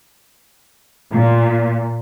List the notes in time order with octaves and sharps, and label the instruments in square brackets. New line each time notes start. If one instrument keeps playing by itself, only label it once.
[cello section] A#2